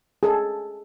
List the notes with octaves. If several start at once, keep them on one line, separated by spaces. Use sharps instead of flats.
G#4 A4